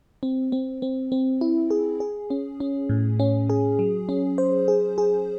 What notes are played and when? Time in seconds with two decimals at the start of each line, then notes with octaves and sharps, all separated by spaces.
0.23 C4
0.52 C4
0.82 C4
1.12 C4
1.41 E4
1.71 G#4
2.00 G#4
2.30 C#4
2.60 C#4
2.90 A2
3.20 C#4
3.50 G#4
3.79 F#3
4.09 C#4
4.38 C5
4.68 G#4
4.98 G#4